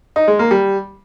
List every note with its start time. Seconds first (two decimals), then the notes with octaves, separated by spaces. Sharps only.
0.16 D#4
0.28 G#3
0.39 A#3
0.51 G3